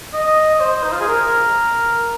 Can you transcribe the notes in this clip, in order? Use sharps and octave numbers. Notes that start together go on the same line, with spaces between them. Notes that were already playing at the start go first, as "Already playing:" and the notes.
D#5
D#5
C5
D#4
F4
G#4
A#4